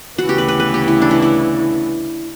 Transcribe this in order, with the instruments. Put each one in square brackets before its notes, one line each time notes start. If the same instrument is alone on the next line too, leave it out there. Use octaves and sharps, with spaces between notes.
[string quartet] D2 C#3 E3 B3 [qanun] F#4
[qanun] G4
B4
B4
B4
G4
E4
D4
E4
E4